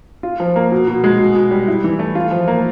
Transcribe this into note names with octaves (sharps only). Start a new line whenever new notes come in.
F4
F3
A#3
B2
B2
G#3
B2
B2
G3
E4
E3
A3
F4
F3
A#3